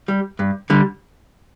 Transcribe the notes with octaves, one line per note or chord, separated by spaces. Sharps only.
G3
G2
D3 G3